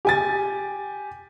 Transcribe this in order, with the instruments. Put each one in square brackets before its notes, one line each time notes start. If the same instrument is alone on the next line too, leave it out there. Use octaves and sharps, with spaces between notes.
[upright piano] G4 G#5 A6